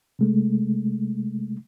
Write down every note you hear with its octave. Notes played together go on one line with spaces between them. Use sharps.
C3 G#3 A3